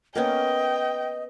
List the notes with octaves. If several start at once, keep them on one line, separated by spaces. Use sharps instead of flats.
A#3 B3 C#4 D#5 G5